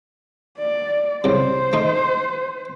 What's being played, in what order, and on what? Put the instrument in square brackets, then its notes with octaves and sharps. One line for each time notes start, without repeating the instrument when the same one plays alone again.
[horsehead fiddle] D5
[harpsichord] C2 C#3 [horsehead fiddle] C5
[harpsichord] A3 D#4